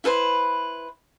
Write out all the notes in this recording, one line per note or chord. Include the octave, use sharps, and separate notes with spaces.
E4 A4 B4 C5